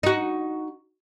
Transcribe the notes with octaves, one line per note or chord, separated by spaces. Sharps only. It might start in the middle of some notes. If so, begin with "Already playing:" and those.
D#4 F#4